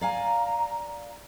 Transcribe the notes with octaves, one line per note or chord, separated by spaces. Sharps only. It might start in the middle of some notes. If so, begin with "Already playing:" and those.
D5 F5 G#5 A#5